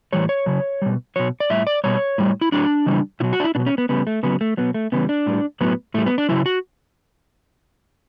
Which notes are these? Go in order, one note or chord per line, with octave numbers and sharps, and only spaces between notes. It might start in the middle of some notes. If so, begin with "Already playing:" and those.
A2 E3 G3 C#5
C#5
C#3 F#3
B2 G3
B2 F#3 C#5
D5
A2 G3 E5
D5
B2 G3 C#5
A2 G3
E4
A2 F#3 D4
C#3 E3 G3
B2 F#3 E4
F#4
D4
E4
B2 F#3 D4
C#4
B3
C#3 G3 B3
A3
C#3 F#3 B3
A3
B2 F#3 B3
A3
C#3 E3 G3 B3
D4
A2 G3
A2 F#3 B3
A2 G3 A3
B3
D4
C#3 F#3 E4
F#4